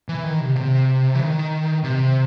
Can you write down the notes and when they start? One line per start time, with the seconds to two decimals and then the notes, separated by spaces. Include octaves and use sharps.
0.09 E3
0.24 D#3
0.40 C3
0.56 C3
1.15 E3
1.20 D#3
1.84 C3